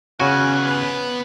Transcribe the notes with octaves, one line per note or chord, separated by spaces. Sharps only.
C#3 B3 C#4 F#4 G#5 F#6
B4